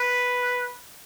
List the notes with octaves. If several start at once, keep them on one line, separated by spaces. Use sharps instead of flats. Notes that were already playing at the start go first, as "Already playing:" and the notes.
Already playing: B4